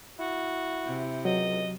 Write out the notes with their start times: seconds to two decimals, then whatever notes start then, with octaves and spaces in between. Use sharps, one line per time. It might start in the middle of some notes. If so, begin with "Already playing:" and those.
0.19 E4 F#4
0.85 C3
1.25 C#2 F#3 D#5